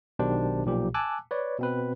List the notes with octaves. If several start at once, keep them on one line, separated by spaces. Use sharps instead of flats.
B1 B2 D#3 D4 G4 C5
B1 A#2 F3 G4
G#5 A5 D6 E6 F#6
B4 C#5 D5
B2 C4 B4